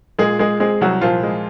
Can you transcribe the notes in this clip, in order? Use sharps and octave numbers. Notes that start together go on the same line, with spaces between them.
A#2 G#3 G#4
G#3 G#4
G#3 C4 G#4
C2 F#3 F#4
A#2 F3 F4
G#3